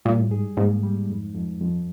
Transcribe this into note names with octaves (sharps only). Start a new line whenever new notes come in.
A#2 G3
A2
G#2 G#4
G#2 A#3
G3
F2
F2
F2